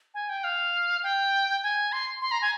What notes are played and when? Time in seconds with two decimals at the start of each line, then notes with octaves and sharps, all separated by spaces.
0.14 G#5
0.29 G5
0.44 F5
1.03 G5
1.63 G#5
1.92 C6
2.22 C6
2.31 A#5
2.42 G#5